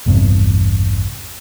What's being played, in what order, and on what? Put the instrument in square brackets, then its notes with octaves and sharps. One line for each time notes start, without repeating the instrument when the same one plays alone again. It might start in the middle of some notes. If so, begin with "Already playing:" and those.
[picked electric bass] A1 E2 G2 C3